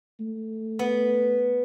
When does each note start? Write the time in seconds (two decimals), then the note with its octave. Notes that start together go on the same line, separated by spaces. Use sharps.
0.20 A3
0.79 B3